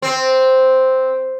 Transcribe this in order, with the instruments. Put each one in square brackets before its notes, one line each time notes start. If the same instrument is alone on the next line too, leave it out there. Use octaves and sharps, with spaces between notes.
[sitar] C4